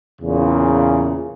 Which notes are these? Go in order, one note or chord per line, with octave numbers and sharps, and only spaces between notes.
E2 A#2 C#3